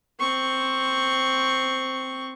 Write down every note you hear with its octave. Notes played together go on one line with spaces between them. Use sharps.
C4 C#6